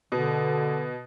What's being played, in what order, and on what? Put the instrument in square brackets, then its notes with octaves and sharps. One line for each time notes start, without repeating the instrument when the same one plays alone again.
[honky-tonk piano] B2 [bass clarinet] D3